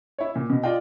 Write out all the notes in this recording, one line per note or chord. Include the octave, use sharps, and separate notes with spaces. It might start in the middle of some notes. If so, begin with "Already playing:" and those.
E4 C#5
A#2
B2
F4 D5 D#5 F5 G5